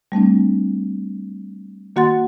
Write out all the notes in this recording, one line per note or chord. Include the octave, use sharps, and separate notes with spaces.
G3 A3 C4 D4
D#3 A#3 F#4 F#5 C6 A6